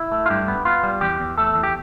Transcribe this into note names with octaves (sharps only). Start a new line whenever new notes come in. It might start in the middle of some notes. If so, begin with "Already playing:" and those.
Already playing: E4
A3
F4
G2 G4
B3
B3 F4
G3
E2 G4
E2
A3 A4
E2
G4